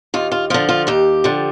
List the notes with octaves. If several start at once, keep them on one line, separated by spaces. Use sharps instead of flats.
D#2 F4
F4
D3 F3 F4
F4
D#2 G4
D3 F3